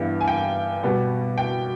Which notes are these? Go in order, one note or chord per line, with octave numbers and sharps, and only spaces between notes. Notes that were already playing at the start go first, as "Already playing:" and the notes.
Already playing: G2 E3 G3 B3
G#5
G5
B2 G3 B3
G5